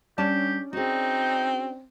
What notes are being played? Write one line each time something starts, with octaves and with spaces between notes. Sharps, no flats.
G3 C#4 D4 G4 D5 A5
C4 D#4 F#4 G#4